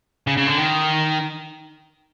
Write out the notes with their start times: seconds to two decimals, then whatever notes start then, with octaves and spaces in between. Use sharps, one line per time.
0.27 C#3
0.37 C#3
0.47 D3
0.58 D#3